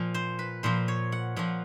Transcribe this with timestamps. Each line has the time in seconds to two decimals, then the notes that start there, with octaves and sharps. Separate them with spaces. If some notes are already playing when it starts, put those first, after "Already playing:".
Already playing: A#2 F3
0.14 C5
0.39 B4
0.63 A#2 F3 C5
0.88 C#5
1.12 F#5
1.36 A#2 F3 F#5